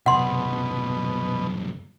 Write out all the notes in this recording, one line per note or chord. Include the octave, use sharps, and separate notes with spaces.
C2 F#2 B2 F#5 C6